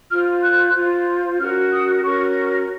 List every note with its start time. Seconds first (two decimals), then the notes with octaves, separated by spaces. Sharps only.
0.10 F4 C5 F6
0.43 F#6
0.75 F4 C5
1.39 C#4 F#4 A#4 F6
1.72 D#6
2.04 C#4 F#4 A#4 C#6